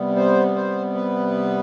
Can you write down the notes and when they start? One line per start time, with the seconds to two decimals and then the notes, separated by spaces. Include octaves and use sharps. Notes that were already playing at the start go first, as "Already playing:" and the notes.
Already playing: C3 G3 B3
0.16 C5
0.55 C5
0.95 B4